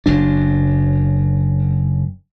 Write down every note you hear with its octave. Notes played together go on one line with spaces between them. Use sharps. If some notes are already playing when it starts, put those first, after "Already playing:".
F#1 F#3 D4